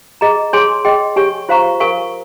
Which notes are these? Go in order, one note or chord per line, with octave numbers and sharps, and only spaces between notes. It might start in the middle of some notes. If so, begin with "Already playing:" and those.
G#4 D#5 A#5
G#4 C#5 G#5 C6
G#4 D#5 G5 C6
G4 C#5 G#5 C#6
F4 C5 F5 A#5 C#6
A#4 F5 G#5 C#6